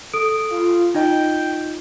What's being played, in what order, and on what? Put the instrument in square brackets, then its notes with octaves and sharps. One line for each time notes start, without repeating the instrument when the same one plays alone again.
[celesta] A4 D#6 D7
[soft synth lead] F4
[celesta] D#4 F4 D#5 [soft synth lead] G5